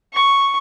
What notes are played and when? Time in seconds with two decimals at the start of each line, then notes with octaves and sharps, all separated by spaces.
0.13 C#6